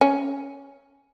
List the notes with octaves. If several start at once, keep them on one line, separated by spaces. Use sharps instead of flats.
C#4